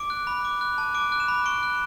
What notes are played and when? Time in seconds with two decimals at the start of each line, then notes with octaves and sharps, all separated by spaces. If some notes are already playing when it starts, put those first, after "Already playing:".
Already playing: D6 D7
0.10 F#6
0.27 B5
0.45 D6
0.61 F#6
0.78 A5
0.95 D6 D7
1.12 F#6
1.20 E7
1.28 B5
1.46 C#6 D7
1.63 F#6